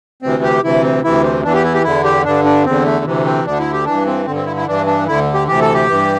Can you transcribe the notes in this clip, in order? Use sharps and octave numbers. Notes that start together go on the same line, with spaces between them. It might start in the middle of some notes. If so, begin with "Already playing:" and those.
D2 C3 E3 C4
G4
D2 C3 E3 E4
C4
D2 C3 E3 E4
C4
E2 E3 D4
G4
E4
G4
E2 D3 E4
G4
G2 D3 D4
D4
E2 D3 C4
A3
D2 C3 E3
C4
D2 D3 D4
E4
G4
G2 E3 D4
C4
G2 D3 C4
C4
E4
E4
G2 E3 D4
D4
D2 D3 E4
G4
D2 C3 E3 G4
A4
G4
G2 E3